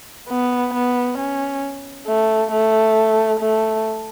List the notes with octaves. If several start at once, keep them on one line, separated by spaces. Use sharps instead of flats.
B3
B3
C#4
A3
A3
A3